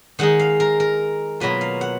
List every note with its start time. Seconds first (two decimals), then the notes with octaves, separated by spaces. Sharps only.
0.19 D#3 G#3 D#4 F#5
0.39 F5
0.60 A#4
0.80 A#4
1.40 B2 F#3 A#3 F4 B4
1.61 F5
1.81 F#5